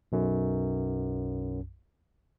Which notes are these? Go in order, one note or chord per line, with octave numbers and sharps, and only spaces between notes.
B1 F#2